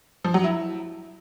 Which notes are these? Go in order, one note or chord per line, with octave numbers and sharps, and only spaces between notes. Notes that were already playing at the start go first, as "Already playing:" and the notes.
F3
F#3
E4